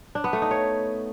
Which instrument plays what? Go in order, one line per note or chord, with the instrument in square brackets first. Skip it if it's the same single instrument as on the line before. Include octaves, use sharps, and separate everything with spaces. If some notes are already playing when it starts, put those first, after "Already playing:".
[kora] D4
B3
A3
D#4
C#5